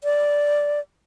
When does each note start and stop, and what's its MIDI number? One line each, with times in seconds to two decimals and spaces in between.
0.04 0.80 74